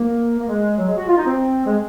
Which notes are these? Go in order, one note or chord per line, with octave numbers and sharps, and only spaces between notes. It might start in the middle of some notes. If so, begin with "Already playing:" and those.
Already playing: A#3
A#3
G#3
F#3
G#3
F#4
F4
D#4
C4
G#3